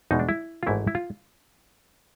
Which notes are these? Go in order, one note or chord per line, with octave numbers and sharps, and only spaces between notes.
E2 B2 G#3 D#4
D4
E4
F4
G#1 G#2 E3 A3 E4
E4
F4